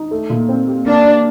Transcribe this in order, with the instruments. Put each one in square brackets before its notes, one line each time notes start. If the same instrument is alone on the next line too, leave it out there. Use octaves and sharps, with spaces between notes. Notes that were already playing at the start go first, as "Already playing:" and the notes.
Already playing: [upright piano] D#4
A3
A#2
C4
G4
[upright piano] A#3 [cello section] D4
[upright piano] A#3